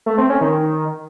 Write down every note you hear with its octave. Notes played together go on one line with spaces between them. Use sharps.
A3
C4
C#4
D#3